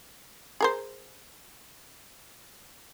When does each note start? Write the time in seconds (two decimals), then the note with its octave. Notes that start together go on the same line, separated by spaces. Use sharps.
0.60 G#4 A#4 C5